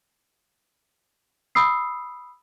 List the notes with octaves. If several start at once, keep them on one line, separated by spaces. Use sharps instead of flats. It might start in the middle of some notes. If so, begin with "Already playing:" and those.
B5 D#6 E6 C7